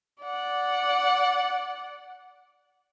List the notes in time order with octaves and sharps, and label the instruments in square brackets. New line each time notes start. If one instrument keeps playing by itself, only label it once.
[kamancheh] D5 F#5